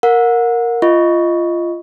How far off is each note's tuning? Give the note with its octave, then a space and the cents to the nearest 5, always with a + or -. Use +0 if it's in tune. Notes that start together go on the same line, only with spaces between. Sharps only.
A#4 +0 F#5 -30
F4 -15 D#5 +0 C#6 +10